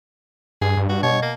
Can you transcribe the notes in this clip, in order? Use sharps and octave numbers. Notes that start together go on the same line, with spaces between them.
G2 G#4
G2
G2 F#4
B2 C#5
A#3